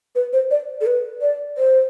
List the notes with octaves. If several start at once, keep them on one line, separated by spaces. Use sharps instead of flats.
B4
C5
D5
A4
B4
D5
C5